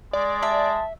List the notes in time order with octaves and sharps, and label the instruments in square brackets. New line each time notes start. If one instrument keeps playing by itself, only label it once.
[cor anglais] G#3 [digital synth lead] D5
[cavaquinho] E5 [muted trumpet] A5